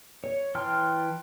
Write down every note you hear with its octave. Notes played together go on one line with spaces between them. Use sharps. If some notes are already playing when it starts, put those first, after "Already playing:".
C#5
E3 G5 A5 C6 F6